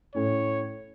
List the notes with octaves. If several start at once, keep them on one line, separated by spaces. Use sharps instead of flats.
A2 C#4 C#5